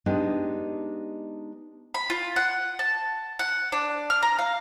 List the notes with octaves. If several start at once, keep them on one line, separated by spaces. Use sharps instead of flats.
G#3 B3 D4 D#4 G4
B5
F4
F#5
A5
F#5
D4
F6
A#5
F5